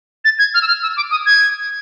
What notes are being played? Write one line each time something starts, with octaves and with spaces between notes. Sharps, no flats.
A6
G#6
F6
E6
F6
E6
D6
D#6
G#6